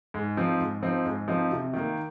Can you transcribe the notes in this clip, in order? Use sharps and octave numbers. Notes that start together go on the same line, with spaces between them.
G#2
F3 C4 D#4
G#2
F3 C4 D#4
G#2
F3 C4 D#4
C3
D#3 A#3